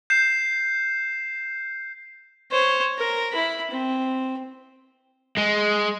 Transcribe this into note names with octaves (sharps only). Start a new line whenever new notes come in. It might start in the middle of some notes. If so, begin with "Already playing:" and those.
G6 C7 E7
C5 C#5
A#4
E4 B5
C4
G#3